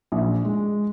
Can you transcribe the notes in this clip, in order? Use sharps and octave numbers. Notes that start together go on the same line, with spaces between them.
A#1
G#3